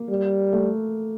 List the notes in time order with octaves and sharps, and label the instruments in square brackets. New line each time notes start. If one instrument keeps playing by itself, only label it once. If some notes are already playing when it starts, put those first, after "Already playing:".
Already playing: [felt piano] A#3
[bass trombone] G3
[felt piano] A3